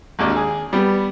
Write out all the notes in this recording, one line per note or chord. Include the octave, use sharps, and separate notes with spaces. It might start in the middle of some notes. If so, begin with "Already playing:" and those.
G#1 D#2 D4
G#4
G3 B3